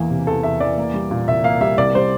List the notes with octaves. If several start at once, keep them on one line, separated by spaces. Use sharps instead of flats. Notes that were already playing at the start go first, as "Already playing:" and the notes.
Already playing: E2 E3 A#3
C3
E2 A4
E2 E5
E3 D5
A#3
G3
A#2
C2 E5
A#3 F5
G3 E5
C2 D5
G3 C5